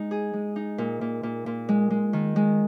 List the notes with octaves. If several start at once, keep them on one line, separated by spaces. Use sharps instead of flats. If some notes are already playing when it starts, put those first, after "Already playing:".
Already playing: G#3 D#4
G#4
G#3
D#4
A#2
A#2
A#2
A#2
G#3
G#3
D#3
G#3